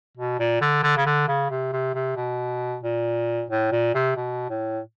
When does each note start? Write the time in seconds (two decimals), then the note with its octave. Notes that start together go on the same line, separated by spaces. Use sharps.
0.17 B2
0.39 A#2
0.61 D3
0.83 D3
0.97 C#3
1.06 D3
1.28 C#3
1.50 C3
1.72 C3
1.94 C3
2.16 B2
2.83 A#2
3.50 A2
3.72 A#2
3.95 C3
4.16 B2
4.49 A2